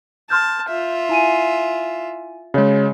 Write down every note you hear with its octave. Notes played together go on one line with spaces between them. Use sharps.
A5 C6 F6 G6
F4 E5
E4 G#5 D#7
C#3 G#3 F#4 C#5 D#5